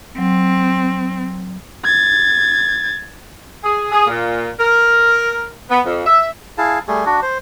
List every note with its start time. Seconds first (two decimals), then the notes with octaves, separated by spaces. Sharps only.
0.18 F#3 C4
1.84 G#6 A6
3.64 G#4
3.92 G#4
4.07 A#2
4.58 A#4
5.69 B3
5.85 F2
6.06 E5
6.58 E4 G#4 F5 A5
6.88 G3 A3 G#4
7.06 D4 F#4
7.22 C5